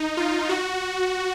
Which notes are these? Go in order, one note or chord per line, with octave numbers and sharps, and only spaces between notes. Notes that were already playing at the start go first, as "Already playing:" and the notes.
Already playing: D#4
F4
F#4